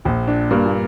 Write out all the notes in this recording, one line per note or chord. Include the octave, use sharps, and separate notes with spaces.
A#1 A#2
D4
G2 A#3
A#2